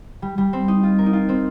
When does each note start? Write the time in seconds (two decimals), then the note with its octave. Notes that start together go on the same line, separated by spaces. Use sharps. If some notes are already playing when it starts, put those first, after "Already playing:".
0.22 G3
0.38 G3
0.53 C4
0.68 D#4
0.83 F4
0.99 A#4
1.06 D#4
1.13 F4
1.29 C4